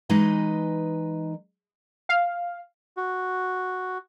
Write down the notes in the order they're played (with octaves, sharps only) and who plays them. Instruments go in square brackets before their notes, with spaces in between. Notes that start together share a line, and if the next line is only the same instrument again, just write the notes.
[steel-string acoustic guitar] E3 G#3 D#4 B4 D#5
[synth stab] F5
[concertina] F#4